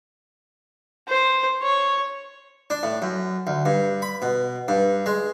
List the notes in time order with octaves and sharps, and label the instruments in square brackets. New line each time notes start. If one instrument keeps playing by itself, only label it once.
[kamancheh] C5
C#5
[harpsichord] D4
A2
F#2
D2
G2
B5
B2
G2
G#3